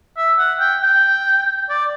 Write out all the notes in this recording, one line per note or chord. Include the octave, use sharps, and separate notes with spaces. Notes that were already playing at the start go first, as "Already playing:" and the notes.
E5
F#5
G5
G5
D5